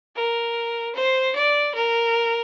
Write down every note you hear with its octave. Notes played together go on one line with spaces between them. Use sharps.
A#4
C5
D5
A#4